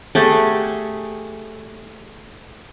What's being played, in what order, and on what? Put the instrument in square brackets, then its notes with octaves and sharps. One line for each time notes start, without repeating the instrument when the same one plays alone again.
[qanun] A3 G4 G#4 F#5